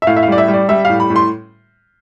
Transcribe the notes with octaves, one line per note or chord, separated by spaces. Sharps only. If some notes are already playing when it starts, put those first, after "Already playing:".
E5
A2 F5
E5
F5
G3 D5
E5
G3
D5
G3 E5
A2 F5
B5
A2
C6